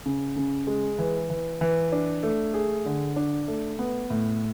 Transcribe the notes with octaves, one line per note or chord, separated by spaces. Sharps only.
C#3
C#3
G#3
E3
E3
E3
D4
A3
G#4
D3
D4
A3
B3
A2